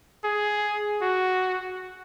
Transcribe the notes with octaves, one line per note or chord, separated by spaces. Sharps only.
G#4
F#4